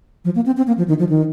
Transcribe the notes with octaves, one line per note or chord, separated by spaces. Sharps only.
F3
A#3
C4
C4
A#3
F3
D#3
F3
D#3